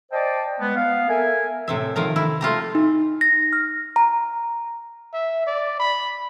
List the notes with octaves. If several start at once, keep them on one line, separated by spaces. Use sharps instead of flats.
C5 D5 D#5 G5 A5
G#3 B3
B3 F5
A4 A#4 E5 G#5
A2 C3 E5
D#3 F3 A#4 A#5
E4
A3 F4 G4 A#5
D#4
A#6
F6
A#5
E5
D5
B5